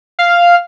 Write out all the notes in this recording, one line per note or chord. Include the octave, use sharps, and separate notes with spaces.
F5